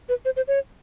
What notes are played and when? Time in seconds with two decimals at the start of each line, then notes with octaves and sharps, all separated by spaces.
0.09 B4
0.25 C5
0.36 C5
0.48 C#5